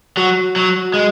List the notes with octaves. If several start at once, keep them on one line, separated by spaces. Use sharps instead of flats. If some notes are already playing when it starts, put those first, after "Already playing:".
F#3 F#4
F#3
G#3